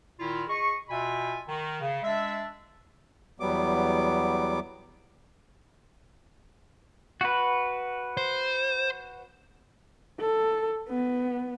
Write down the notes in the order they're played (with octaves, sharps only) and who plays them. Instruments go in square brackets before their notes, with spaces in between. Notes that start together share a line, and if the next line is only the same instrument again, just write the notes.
[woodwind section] A#2 D#3 E4 F4
G#4 D#5 C#6
B2 F4 E5 G#5 B5
D#3
C#3
G#3 D4 E5
[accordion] E2 F#3 G3 B3 D6
[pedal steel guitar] F#4 B4
[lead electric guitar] C5
[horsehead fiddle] A4
B3